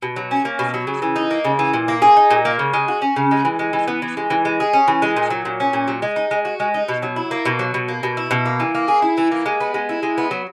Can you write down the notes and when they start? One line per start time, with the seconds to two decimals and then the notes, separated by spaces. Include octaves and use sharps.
0.02 B2
0.16 F#3
0.31 C#4
0.45 A#3
0.59 B2
0.74 F#3
0.87 C#3
1.02 E3
1.16 D#4
1.31 A#3
1.45 C#3
1.59 E3
1.74 A#2
1.88 A#3
2.02 G#4
2.17 D#4
2.31 A#2
2.45 A#3
2.59 C#3
2.73 G#3
2.88 F#4
3.02 C#4
3.16 C#3
3.31 G#3
3.45 E3
3.59 G#3
3.73 E3
3.88 B3
4.02 E3
4.17 G#3
4.30 E3
4.45 G#3
4.60 G#4
4.73 C#4
4.88 E3
5.02 G#3
5.16 A#2
5.30 F#3
5.45 A#2
5.60 C#4
5.73 A#2
5.88 F#3
6.02 G#3
6.16 D#4
6.31 G#3
6.45 F#4
6.60 G#3
6.74 D#4
6.88 B2
7.03 F#3
7.16 E4
7.31 A#3
7.45 B2
7.59 F#3
7.74 B2
7.88 A#3
8.03 B2
8.17 E4
8.31 B2
8.46 A#3
8.60 E3
8.75 A#3
8.88 G#4
9.02 E4
9.18 E3
9.31 A#3
9.46 G#3
9.60 B3
9.74 G#3
9.89 E4
10.03 G#3
10.18 B3
10.31 F#3